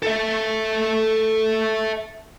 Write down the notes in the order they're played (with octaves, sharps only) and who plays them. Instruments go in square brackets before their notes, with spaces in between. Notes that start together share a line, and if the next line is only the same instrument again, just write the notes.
[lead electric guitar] A4 E5